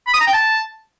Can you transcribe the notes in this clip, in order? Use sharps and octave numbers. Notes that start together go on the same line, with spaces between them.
B5
D#6
A#5
G5
A5